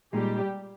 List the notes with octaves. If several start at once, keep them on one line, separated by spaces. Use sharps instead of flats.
A#2 G3 G#3 D#4 G4